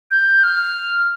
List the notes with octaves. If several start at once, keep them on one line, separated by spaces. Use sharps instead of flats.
G6
F6